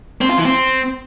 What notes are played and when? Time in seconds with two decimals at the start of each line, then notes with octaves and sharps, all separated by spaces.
0.21 C4
0.29 F4
0.37 E3
0.45 C4